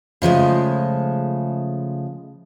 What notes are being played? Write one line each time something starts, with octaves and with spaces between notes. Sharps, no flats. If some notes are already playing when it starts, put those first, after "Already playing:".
C#3 F3 G#3 A3